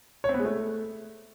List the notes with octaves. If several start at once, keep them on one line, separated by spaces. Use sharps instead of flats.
C#5
C4
B3
G#3
A3